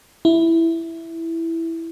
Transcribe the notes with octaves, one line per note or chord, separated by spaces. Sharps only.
E4